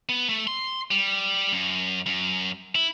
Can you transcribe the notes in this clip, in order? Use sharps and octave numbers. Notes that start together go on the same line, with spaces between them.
B3
A3
C6
G3
F#2
F#2
E4